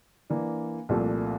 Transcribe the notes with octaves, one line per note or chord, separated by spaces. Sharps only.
E3 A#3 D4
C2 A#2 F3 A3